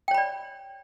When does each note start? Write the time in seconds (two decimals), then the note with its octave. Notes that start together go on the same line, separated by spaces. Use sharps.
0.08 G5
0.11 C#5
0.14 B5
0.18 D5